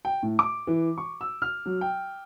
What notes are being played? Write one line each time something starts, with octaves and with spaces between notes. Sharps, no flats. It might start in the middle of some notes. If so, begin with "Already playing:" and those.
G5
A2
D6
E3
C#6
E6
F6
F#3
G5